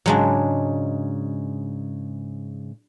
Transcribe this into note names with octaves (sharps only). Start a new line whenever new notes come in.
G#2 C#3 F#3 G#3 D4